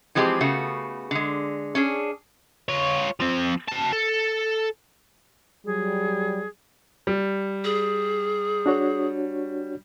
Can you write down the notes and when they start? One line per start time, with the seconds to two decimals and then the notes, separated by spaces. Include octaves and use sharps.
0.15 E3 F3 G#3 C4 G4
0.41 C#3 A3 B3 F#4
1.11 D3 G#3
1.75 C#4 D4 G#4
2.69 F4 C#5
3.20 F3 C4
3.69 F#4 A5
3.93 A4
5.65 F#3 G3 G#4
7.07 G3
7.64 G#4
8.66 D4 F#4 C#5